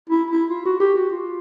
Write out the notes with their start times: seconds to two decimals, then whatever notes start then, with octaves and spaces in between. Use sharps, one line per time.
0.10 E4
0.30 E4
0.50 F4
0.65 F#4
0.80 G4
0.95 F#4
1.11 F4